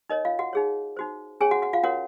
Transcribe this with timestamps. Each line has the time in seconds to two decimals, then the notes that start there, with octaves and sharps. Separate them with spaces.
0.10 D#4 A#4 C#5 D#5
0.25 F4 F5
0.39 F#4 F#5
0.53 D#4 G#4 C#5
0.97 D#4 F#4 C5
1.41 C#4 G#4 C#5 G#5
1.51 F#4 F#5
1.62 F#4 F#5
1.73 F4 F5
1.83 C#4 F#4 A#4 C#5 F#5